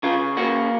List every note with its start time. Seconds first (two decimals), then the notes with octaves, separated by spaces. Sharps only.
0.03 C#3 F4
0.37 A#3 F#4